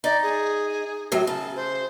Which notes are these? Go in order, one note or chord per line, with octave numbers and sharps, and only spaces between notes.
D#4 D5
G#4
F#2 A2 F#3
C#3 A5
C5